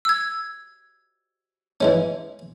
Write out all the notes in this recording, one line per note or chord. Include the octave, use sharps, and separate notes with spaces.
E6 G#6
E3 G#3 C#4